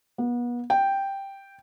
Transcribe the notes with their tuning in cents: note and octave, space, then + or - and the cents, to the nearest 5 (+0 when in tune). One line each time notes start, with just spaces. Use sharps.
B3 -35
G5 +0